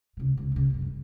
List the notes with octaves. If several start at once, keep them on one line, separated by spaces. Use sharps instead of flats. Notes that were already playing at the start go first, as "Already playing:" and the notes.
C#2 C3
C#2 C3
F#1 C#3
G1 F#2
G2